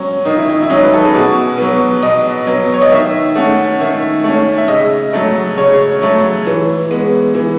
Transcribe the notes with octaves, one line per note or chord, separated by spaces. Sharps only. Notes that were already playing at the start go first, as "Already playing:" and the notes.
Already playing: F#3 C#4
D#3 D#4
E4
D#4
E4
F#3 C#4 D#4
B4
A4
G#4
B2 F#4
F#3 B3
B2 D#5
F#3 B3
C#5
D#5
D#3 E5
A3 C#4 F#5
D#3 E5
A3 C#4
E5
C#3 D#5
F#3 A3
C#3 C#5
F#3 A3
E3
G#3 B3
E3